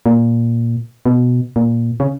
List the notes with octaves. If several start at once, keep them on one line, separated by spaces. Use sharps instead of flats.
A#2
B2
A#2
C#3